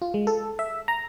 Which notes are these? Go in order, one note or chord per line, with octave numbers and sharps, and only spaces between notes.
F4
G#3
A4
E5
A#5